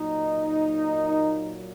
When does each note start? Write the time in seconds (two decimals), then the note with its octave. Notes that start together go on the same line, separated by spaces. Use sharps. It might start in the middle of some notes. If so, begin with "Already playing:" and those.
Already playing: A#2 F#3 A#3 D#4